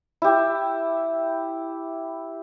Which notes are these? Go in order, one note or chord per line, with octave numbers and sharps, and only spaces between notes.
E4 G4